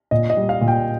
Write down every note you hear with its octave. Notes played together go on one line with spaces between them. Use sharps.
A#2 D#5
D#5
G3
F5
A#2
G5